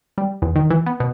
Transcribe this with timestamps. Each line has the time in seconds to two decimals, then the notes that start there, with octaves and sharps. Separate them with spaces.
0.18 G3
0.42 E2
0.56 D#3
0.70 E3
0.86 B3
1.00 B2